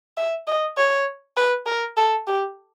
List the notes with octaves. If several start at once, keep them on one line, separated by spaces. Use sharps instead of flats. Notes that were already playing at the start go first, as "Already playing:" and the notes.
E5
D#5
C#5
B4
A#4
A4
G4